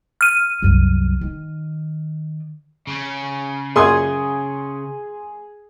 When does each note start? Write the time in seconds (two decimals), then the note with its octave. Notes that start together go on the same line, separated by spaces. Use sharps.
0.21 F6 D#7
0.62 C2 F#2
1.21 D#3
2.87 C#3 C#4
3.76 F#2 A#2 G#4 C6 D#6 G#6